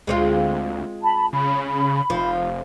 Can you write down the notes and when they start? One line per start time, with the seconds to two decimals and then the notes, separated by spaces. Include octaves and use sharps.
0.07 D2 G#3 C4 F4
1.03 A5 B5
1.33 C#3 B5
2.10 F1 F3